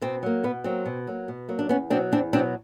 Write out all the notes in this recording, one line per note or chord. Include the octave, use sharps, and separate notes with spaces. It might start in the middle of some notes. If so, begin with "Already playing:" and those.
B2 C4
F#3 A#3
B2 B3
F#3 A#3 C4
B2
F#3 A#3
B2
F#3 A#3
D4
E2 B3 C#4
B2 F#3 C4 D4
E2 C4 D4
B2 F#3 C4 D4